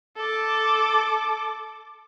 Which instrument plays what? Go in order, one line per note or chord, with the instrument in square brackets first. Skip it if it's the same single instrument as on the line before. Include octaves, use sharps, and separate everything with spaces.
[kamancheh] A4 D6